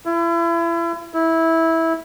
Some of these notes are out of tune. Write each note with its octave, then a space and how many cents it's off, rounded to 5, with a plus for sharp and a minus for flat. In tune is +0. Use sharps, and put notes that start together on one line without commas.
E4 +35
E4 -15